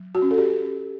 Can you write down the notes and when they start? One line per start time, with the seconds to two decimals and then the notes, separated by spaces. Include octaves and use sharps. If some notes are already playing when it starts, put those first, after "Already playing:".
Already playing: F#3
0.15 F#4
0.22 C#4
0.31 A4
0.38 G4